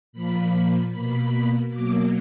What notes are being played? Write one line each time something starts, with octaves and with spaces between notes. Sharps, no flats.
A#2 F3 A#3 B5
B2 A#3 B5
B2 F#3 A#3 D6